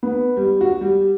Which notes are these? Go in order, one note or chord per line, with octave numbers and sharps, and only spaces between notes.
B3
G3
F#4
G3